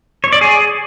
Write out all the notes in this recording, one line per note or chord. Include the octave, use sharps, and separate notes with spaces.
C#5
D5
G#4